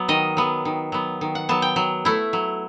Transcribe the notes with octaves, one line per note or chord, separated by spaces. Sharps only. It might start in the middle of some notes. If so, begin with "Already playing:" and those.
Already playing: F#3 B3
D#3 D#5
F#3 B3
D#3
F#3 B3
D#3
F#5
F#3 B3 A5
G5
F#3
A3 E4
F#3